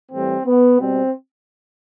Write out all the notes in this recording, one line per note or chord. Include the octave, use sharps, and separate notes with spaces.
A2 E3 G3 C4
B3
B2 G3 C4